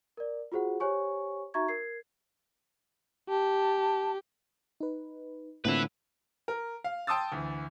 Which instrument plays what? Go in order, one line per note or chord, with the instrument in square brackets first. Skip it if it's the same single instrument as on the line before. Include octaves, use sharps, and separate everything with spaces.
[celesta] A#4 D5
F4 F#4 G#4 C5 F#5
G4 C5 C#5 G#5 C#6
D#4 F#4 E5 A#5 C#6 G#6
A#4 G#6 C7
[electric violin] G4 [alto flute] A5
[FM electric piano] D#4 B4
[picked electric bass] A2 D3 [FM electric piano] A#3 C4 F4 [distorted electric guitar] E4 B4
[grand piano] A#4
F5
G5 A5 C6 D#6 E6 A6
D2 E3